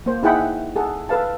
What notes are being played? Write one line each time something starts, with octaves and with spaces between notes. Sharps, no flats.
A#3 C5
D#4 E4 G#4 F#5 G5 B5
G#4 A4 F#5
A4 B4 F5 A5